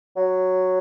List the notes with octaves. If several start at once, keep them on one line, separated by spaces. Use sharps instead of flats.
F#3